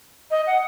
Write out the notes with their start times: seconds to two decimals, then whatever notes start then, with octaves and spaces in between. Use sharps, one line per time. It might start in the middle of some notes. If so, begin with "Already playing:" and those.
0.31 D#5
0.47 F#5